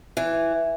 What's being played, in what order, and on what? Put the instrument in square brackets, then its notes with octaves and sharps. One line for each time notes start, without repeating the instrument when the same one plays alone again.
[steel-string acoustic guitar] E3